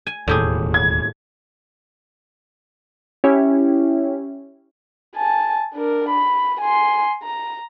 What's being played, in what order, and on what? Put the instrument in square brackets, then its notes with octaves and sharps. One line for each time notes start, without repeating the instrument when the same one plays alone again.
[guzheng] G#5
[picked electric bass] E1 D#2 [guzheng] A2 G4 G#4
[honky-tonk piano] G#6
[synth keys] C#4 E4 G4
[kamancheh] G#5 A5
D4 A#4
B5
G#5 C6
A#5